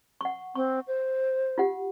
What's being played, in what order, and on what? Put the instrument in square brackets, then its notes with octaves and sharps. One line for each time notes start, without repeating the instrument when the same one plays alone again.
[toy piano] F#5 C#6
[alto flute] C4 [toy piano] C#6
[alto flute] C5
[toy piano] F4 G4 F#5